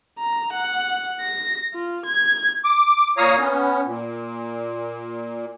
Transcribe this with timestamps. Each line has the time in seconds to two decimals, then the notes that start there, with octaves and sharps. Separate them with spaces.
0.19 A#5
0.54 F#5
1.20 A#6
1.74 F4
2.06 G#6
2.64 D6
3.17 A#2 C#5 F5 A#5 D#6
3.39 B3 C#4
3.86 A#2